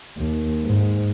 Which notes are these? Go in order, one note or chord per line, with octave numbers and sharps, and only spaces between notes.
D#2
G#2